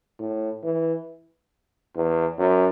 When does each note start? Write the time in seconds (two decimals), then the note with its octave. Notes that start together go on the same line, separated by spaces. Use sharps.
0.19 A2
0.63 E3
1.95 E2
2.38 F#2